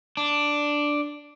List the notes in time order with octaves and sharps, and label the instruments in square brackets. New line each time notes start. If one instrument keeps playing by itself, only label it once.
[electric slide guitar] D4